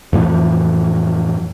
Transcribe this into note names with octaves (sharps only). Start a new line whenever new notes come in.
F2 A2 E3 F3